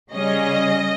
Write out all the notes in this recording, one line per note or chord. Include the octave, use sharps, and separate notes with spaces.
C#3 G3 C#4 D#5